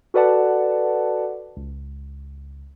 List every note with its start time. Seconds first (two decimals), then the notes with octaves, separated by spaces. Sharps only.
0.14 F#4 A4 B4 D5 F#5 A5
1.57 C#2